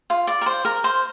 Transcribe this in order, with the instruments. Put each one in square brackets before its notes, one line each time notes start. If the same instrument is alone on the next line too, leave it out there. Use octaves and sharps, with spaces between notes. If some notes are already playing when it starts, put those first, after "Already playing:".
[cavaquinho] F4
D5
A#4
C5
A#4
C5